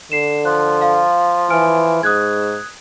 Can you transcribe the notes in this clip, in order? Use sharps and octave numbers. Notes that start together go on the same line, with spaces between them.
D3 C7 E7
F3 F#6
F5
E3 G#5 F6 D7
G#2 D#6 F#6 G#6